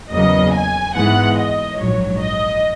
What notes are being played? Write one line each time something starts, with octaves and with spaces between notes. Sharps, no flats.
E2 C#3 F#3 A#3 D#5
G#5
G#2 E3 G#3 B3 F#5
D#5
A#1 G#2 F#3 C#5
D#5